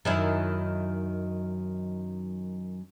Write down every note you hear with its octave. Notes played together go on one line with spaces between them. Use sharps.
F#2 D#3 E4